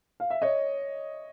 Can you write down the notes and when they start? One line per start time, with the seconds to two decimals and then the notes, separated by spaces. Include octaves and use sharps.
0.20 F5
0.30 E5
0.42 C#5 D#5